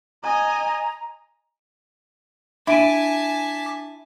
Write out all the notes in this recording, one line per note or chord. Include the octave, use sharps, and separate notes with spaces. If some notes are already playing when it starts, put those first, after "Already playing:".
D#5 G#5 A#5
D4 E4 G#5 A5 D6 B6 D7 D#7